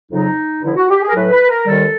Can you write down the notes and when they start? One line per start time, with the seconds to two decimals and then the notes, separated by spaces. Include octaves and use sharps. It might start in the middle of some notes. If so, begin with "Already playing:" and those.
0.11 F2 C#3 F#3 D#4
0.63 G2 D3 F3 E4
0.76 F#4
0.89 G4
1.02 G#4
1.08 A#4
1.14 A2 F#3 B4
1.32 B4
1.49 A#4
1.66 D#2 D#3 G3 A4